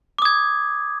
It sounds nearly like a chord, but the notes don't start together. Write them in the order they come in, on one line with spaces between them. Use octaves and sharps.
D6 D#6 G#6